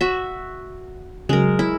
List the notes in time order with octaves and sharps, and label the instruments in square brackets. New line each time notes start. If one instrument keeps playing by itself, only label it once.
[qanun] F#4 E5
[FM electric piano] C#3 F#3 [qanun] G#3 A#4
[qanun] E4